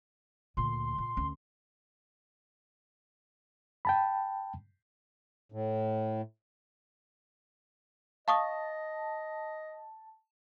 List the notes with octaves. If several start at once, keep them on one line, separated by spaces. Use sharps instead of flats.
D2 A#2 C6
A#2
D2 C#4
G5 A5 B5
A2
D#5 F5 A5 C#6 D#6